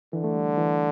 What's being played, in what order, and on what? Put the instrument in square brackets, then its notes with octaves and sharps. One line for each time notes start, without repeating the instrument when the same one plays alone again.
[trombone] D3 [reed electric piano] E3
[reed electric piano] A3
G3
E3